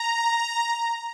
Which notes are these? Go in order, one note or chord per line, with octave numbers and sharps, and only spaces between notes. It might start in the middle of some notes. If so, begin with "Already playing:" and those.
Already playing: A#5